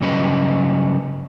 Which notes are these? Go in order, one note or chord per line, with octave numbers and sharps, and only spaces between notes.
G2 C#3 F#3 C#4 B4 D#5